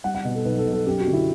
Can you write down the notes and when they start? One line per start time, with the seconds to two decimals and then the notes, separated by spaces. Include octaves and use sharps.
0.04 G3 F#5
0.15 F#5
0.25 B2
0.35 A4
0.45 B1 B4
0.59 A4
0.66 B1
0.73 A4
0.86 F#2 G4
1.00 F#4
1.07 D3
1.13 E4